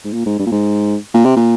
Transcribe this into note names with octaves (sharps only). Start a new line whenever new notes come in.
G#2
A#2
G#2
G2
A#2
G#2
A#2
C3
A#2